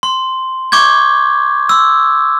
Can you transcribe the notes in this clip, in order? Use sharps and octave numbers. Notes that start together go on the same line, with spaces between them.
C6
C#6 D6 G6 G#6
C6 E6